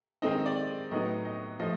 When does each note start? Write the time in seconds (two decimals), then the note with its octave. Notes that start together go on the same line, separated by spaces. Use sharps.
0.22 D#3 G#3 C4 D#4 D#5
0.46 D5
0.91 A2 F#3 B3 D#4 D#5
1.25 D#5
1.59 F3 A3 D#5